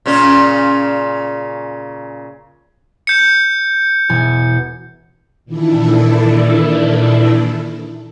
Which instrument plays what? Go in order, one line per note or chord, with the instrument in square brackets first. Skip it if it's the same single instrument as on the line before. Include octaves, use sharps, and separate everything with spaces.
[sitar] A#2 C#3 C#4
[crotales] G6 C#7
[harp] E1 B2 G#5
[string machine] A#2 D#3 E3 D4 E4 A4